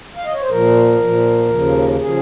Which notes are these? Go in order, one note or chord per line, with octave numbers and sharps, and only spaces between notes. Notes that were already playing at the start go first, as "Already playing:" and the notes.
F5
D#5
C#5
C5
A#2 F3 A#4
A#2 F3
D#2 C#3 F3
C#3 F3 G#4